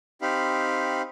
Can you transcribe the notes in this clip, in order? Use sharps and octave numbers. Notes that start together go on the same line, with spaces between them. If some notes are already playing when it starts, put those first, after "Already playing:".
C4 D#4 G4 F5 B5